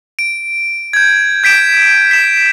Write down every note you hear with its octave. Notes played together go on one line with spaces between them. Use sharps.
D7
G6 G#6
G6 B6 D7 E7
B6 E7